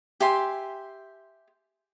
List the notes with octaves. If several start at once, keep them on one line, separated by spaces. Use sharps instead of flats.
G4 E5 G#5 C6